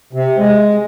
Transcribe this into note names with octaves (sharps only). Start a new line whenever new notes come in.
C3
G#3